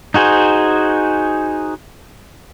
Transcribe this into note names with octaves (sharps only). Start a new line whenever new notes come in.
D#4 F#4 G#4 C5